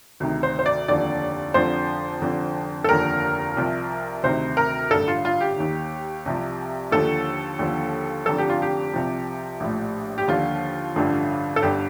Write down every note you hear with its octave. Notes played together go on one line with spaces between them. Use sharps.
D2 C3 D#3
C5
C5
D5
F1 D#2 D3 F3 D5
F1 F2 D3 F3 C5
F1 F2 D3 F3
A4
F1 D#2 D3 F3 A#4
C2 C3 F3
D2 C3 D#3 C5
A#4
A1 G2 D3 A4
F4
F4
G4
D#2 D#3
C2 C3 F3
D#2 D3 F3 A4
D#2 D3 F3
F1 F2 D3 F3 A4
G4
F4
G4
C2 C3 F3
A#1 A2 F3
G4
D#2 D3 F3 F4
A1 G2 D3 F3
A4
G1 G2 D3 G4